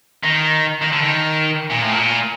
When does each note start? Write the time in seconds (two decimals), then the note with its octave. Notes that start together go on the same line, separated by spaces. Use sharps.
0.24 D#3
0.82 D#3
0.92 D3
1.01 D#3
1.70 A#2
1.82 A2
1.92 A#2